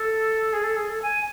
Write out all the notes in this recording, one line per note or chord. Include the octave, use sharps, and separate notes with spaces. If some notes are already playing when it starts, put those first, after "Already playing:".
Already playing: A4
G#4
A4
G#4
A4
G#5